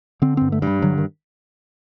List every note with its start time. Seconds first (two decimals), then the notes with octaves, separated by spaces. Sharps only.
0.22 D3 C4
0.37 G2 C4
0.52 A3
0.62 G2 G3
0.82 D3 F#3
0.98 D#3